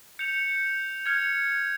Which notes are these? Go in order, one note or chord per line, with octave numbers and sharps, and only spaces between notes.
G6 C#7 F7
F6 G#6 C#7 F7